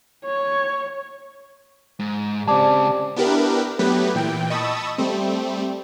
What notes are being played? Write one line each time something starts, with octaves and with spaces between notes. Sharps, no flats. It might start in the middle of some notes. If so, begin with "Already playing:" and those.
C#5
G#2
C#3 G#3 C4 G4 D5 A5 D6
B3 D4 E4 G4 A#4 B4
F#3 A3 B3 G4 B4
A#2 E3 G5
D#5 A5 B5 C#6 D#6 E6
G3 A3 C4